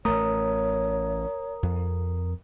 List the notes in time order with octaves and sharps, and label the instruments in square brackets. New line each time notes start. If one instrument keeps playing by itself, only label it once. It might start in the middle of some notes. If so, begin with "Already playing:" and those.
[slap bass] A1 A3 [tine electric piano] A#4 A#5 D#6 [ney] C#5
[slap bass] F2